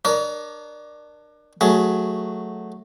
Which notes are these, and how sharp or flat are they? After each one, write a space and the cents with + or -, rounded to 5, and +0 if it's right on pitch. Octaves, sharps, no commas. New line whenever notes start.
D4 +25 A#4 +15 C#5 +45
F#3 +0 A3 +0 G#4 +15